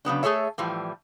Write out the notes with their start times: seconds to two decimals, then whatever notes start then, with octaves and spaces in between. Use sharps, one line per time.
0.05 C#3 F#3 B3 D4
0.23 A3 G#4 A4 C#5 E5
0.58 A2 E3 F3 G3